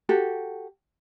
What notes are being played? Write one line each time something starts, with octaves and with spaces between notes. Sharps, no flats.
F#4 G4 A4